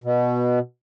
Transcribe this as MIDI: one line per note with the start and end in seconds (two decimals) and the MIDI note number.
0.04 0.59 47